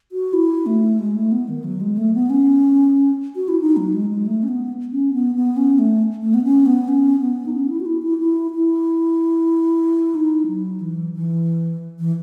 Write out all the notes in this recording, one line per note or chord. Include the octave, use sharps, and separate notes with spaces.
F#4
E4
A3
G#3
A3
B3
D#3
F#3
G#3
A3
B3
C#4
F#4
E4
D#4
F#3
G#3
G#3
A3
C#4
B3
C#4
B3
B3
C#4
A3
A3
B3
C#4
B3
C#4
B3
D#4
C#4
E4
F#4
E4
E4
E4
E4
D#4
F#3
E3
E3
E3